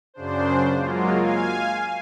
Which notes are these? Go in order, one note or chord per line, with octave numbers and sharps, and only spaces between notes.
F#2 C#3 D4 C5
F#3 G#3 A#3 F4
F5 G#5